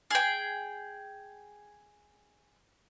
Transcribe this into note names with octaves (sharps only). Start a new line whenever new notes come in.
G#4 G5